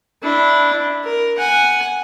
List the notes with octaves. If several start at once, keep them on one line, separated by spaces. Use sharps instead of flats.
D4 E4
A#4
F#5 G#5